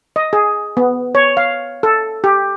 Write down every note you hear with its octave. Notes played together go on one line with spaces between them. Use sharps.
D#5
G#4
B3
C#5
F5
A4
G4